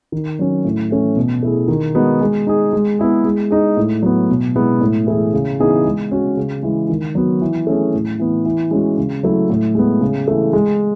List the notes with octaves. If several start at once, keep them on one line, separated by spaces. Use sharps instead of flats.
D#3
F#3 C#4
A2
E3 A3 C#4
B2
A3 E4 G#4
D#3
G#3 B3 D#4 F#4
G#3
D#4 G#4
G#3
B3 E4 G#4
G#3
D#4 G#4
A2
F#3 B3
B2
G#3 B3 E4
A2
E3 A3 E4 G#4
C#3
E3 B3 D#4 G#4
G#3
C#4 F#4
C#3
E3 G#3
D#3
F#3 B3 F#4
E3
A3 C#4 G#4
A2
E3 B3
E3
G#3 C#4 F#4
C#3
F#3 A3 E4
A2
G#3 B3
C#3
E3 A3
G#3